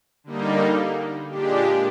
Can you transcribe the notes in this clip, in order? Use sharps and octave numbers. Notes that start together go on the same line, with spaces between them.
D3 G3 A#3 D#4
A#2 G#3 D4 G4